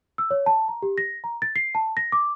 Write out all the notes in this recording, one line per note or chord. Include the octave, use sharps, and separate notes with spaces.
E6
C#5
A5
A#5
G4
A#6
A#5
A6
C7
A5
A#6
D6